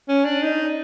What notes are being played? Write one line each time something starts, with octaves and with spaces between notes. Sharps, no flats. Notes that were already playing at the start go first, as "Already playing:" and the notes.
C#4
D4
D#4